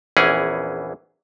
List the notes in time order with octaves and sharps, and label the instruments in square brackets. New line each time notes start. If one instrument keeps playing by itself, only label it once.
[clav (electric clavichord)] A#1 E2 E3 C#4 G#4